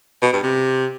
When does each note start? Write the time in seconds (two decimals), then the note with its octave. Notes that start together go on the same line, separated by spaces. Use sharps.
0.22 B2
0.33 G2
0.43 C3